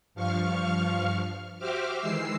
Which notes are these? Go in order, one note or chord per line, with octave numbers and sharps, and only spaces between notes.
G2 F3 F5 C#6 F6
F#4 G4 C5 E5 D6 F6
D#3 E3 G#3 E6 C7